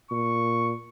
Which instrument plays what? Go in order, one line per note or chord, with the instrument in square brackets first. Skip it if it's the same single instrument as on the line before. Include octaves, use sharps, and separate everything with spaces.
[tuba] A#2 [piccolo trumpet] C#6